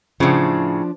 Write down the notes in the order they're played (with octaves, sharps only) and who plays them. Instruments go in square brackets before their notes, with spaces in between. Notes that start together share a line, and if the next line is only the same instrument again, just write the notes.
[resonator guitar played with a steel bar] A2 C#3 [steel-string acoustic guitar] F3 D4